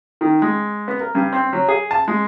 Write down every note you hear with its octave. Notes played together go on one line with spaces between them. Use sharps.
D#3
G#3
B3
A#4
G2
C4
F#3
G#4
A5
G#3